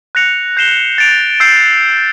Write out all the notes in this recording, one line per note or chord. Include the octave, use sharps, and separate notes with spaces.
F#6 A#6 C#7 F7
G6 C7 E7 G7
A6 D7 F7
E6 G6 C7